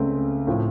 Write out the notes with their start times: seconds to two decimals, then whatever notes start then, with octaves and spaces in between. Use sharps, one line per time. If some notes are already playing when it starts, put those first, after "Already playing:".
Already playing: C#2 C#3 A3 C4
0.47 A2 F3 C4